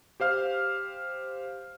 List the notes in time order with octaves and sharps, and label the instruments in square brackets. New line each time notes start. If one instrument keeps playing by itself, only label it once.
[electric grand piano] G4 C5 F5 F6